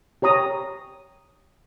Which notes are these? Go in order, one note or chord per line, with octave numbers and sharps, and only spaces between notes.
G4 C#5 A#5 D#6